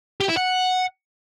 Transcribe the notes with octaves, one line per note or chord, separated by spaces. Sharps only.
G4
E4
F#5